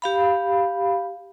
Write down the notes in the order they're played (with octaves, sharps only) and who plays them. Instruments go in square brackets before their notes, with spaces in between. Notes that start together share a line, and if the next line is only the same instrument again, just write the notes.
[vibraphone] G4 F5 B5